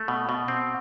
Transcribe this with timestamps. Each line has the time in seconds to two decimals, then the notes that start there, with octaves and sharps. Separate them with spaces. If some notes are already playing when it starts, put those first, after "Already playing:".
Already playing: A3
0.08 B2
0.29 B2
0.48 C4